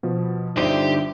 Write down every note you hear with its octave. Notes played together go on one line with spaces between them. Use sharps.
B2 F3
G1 D3 D#4 F4 G4 C5 D5 E5